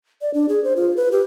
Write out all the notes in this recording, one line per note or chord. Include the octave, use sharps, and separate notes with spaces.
D5
D4
G#4
C5
F4
B4
G4